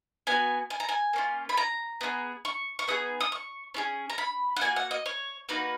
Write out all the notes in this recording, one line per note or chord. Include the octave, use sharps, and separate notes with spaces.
B3 F#4 G#5
G#5
A#5
G#5
A#3 C#4 F4
B5
A#5
B3 F4 G#4
C#6
C#6
B3 D#4 G#4 D#6
D#6
C#6
C#4 F4 G#4
A#5
B5
F#5
A#3 D#4 F#4 G#5
F#5
D#5
C#5
A#3 D#4 F#4 B4